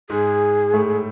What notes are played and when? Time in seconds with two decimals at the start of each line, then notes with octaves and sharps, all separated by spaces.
0.10 G#2 G#3 G#4
0.74 A2 A3